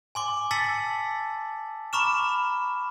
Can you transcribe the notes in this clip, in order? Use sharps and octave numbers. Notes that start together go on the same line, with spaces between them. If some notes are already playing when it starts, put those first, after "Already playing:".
G#5 C6 D6
A5 E6 A6 B6 C#7 F#7
A#5 B5 C#6 D6 F6 E7